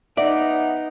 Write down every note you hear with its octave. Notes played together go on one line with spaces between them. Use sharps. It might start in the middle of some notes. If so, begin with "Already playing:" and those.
B3 D#4 D5 E5